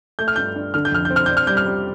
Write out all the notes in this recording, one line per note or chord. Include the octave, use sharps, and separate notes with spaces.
A3 G6
F6
G2 G6
D4
D3 F6
G6
F2 F6
G6
C4
F6
D4 G6
F6
G3 G6
F6
G3